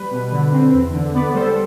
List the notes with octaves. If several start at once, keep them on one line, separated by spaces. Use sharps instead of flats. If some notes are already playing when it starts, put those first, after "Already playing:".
Already playing: G3 B4
B2
D3
C4
E2
D3
B3 B4 D5
G3 A4 C5